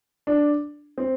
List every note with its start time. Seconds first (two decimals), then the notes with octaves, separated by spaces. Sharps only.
0.27 D4
0.98 C4